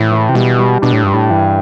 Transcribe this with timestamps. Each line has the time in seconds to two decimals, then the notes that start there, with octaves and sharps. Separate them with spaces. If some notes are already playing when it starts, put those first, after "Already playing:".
Already playing: A2 E3
0.11 E3
0.29 C3
0.34 B2 G3
0.58 G3
0.82 B2 D4
0.93 A2
1.04 G2 G3
1.13 A2
1.30 G2 E3